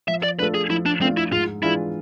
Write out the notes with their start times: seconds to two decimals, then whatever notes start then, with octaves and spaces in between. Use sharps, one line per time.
0.08 F3 E5
0.23 D5
0.39 A3 D4 F4 A4 B4
0.54 G#4
0.70 F3 E4
0.86 D4
1.01 A3 C4 D4 F4 A4
1.17 E4
1.32 G#2 F4
1.63 E3 G#3 D4 E4 F4